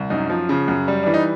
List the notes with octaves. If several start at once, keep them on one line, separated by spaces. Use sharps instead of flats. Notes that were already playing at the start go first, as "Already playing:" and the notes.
Already playing: C2
F#2 D#4
F3
C#3
F#2
G3
E3 D4
D#4